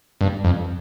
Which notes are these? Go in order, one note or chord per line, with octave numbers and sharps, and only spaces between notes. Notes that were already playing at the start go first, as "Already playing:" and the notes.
G2
F2